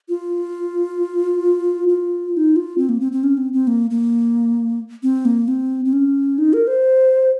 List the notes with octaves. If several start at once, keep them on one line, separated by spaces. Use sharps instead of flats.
F4
F4
F4
D#4
F4
C4
A#3
C4
C4
C#4
C4
C4
A#3
A#3
C4
A#3
C4
C4
C#4
D#4
A#4
C5